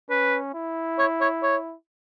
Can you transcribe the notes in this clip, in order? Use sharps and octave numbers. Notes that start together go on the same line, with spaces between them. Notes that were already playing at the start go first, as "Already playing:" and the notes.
C#4 B4
E4
C#5
C#5
C#5